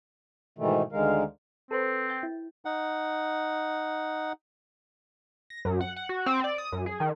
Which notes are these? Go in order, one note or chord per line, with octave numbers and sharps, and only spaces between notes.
G#2 B2 D#3 E3 A3
D2 D3 D#3 G#3 A#4 F5
C4 A4 B4 C5
G5 G6 A6
E4
D#4 F#5
A#6
F#2
F#5
F#5
F#4
C4
D5
D#6
F#2
G#4
D#3